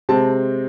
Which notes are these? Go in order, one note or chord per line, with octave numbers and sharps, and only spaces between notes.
C3 G#3 C4 A5